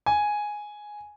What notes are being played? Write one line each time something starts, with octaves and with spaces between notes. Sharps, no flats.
G#5